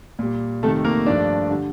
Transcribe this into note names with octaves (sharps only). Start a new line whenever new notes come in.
A#2 G3
F2 C3 D#3 G3 A3 A4
A#3 A#4
G2 F3 A3 D4 D5
D3 G3